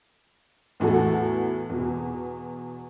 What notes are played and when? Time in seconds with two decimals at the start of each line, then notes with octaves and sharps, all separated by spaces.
0.80 E2 A2 E3 F#4 A4
1.69 E2 B2